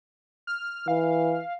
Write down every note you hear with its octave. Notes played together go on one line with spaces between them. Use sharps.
F6
E3 F5